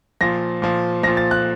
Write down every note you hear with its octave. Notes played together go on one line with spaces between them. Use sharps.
A#2 F3 A#6
A#2 F3
A#2 F3 A#6
A6
F#6